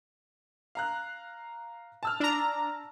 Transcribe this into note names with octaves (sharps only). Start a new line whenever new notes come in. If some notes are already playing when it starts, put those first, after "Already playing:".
F5 A#5 F#6
A5 E6 F6
D4 A#5